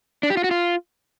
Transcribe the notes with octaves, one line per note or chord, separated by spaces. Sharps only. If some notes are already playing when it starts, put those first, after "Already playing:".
D4
G4
F4
F#4
F4